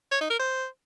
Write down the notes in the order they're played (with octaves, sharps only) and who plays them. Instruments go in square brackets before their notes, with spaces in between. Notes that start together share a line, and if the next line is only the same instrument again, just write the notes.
[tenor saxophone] C#5
D#4
A#4
C5